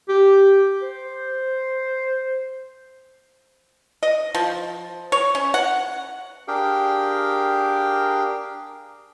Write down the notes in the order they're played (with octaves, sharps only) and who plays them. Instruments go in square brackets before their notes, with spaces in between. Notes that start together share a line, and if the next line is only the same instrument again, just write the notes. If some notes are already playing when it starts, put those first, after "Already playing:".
[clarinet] G4
C5
[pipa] D#5
F3
C#5
C#4
F#5
[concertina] D4 G4 G#4 A#4 F5 G5